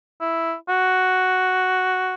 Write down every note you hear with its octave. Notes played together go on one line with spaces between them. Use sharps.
E4
F#4